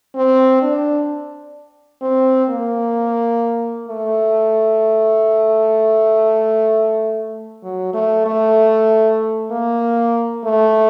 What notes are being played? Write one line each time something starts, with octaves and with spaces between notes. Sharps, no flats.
C4
D4
C4
A#3
A3
F#3
A3
A3
A#3
A3